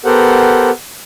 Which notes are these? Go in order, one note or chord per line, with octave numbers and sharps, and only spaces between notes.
B3 G4 A4 A#4 C5 F#5